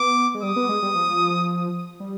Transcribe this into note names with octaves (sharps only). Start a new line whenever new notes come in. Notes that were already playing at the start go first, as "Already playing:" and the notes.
Already playing: B3 D6
G#3
G3 D#6
B3
G#3
G3
F3
G3